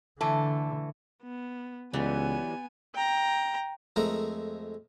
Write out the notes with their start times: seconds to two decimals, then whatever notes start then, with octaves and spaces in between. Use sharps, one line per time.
0.21 D3 E3 A3 A4
1.23 B3
1.94 C#2 E3 F#3 G3 B3 G#5
2.94 G5 A#5
3.96 F2 G#3 A3 A#4